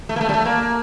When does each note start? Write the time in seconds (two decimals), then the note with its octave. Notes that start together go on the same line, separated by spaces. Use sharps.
0.09 A3
0.16 A#3
0.21 A3
0.29 G3
0.34 A3
0.45 A#3